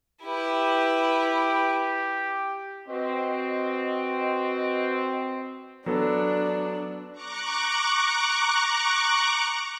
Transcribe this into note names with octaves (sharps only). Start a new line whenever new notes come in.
E4 G4 B4
C4 F#4 B4 D#5
F#3 B3 D4 A4
A#5 C#6 D6 F#6